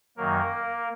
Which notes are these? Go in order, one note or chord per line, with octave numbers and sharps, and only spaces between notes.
F#2 D#3 F#3 A#3 A#4